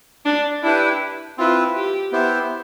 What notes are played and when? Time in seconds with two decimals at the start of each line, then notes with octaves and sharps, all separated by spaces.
0.25 D4
0.63 D4 E4 G4 B4
1.38 C4 E4 F4 B4
1.75 G4
2.12 B3 E4 G4 C5 E5